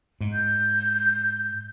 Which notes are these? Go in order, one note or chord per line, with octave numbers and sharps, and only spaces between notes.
G#2
G6